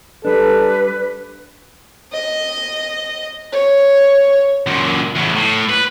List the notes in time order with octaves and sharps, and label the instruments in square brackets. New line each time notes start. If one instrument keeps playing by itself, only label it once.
[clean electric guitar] G3 D4 [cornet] A4 [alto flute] B4
[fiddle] D#5
C#5
[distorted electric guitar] F#2 A#2
E2 A2
A2
B4